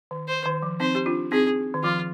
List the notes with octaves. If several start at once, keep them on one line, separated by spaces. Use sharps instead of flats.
D#3
C5
D#3
F3
C4 D#4 C5
G4
D4 F4
C4 D#4 G#4
D#3
F3 F4